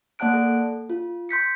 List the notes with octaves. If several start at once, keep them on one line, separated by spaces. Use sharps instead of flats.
A#3 D5 F#5 A5 F#6 D7
A4
F4
C6 G6 B6 C#7